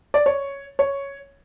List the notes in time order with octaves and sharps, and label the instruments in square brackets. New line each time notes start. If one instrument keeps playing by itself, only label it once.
[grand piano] D5
C#5
C#5